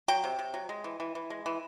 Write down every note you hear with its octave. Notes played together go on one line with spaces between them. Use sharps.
F#3 G5
C3
C3
F#3
G#3
E3
E3
E3
G#3
E3